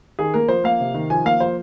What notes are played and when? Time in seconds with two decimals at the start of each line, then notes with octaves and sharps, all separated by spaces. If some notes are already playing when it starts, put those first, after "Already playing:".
0.19 D#3 G#4
0.34 A#3 A#4
0.48 F3 C5
0.64 A#3 F5
0.80 C3
0.94 D#3
1.10 F3 G#5
1.25 A#3 F5
1.40 F3 C5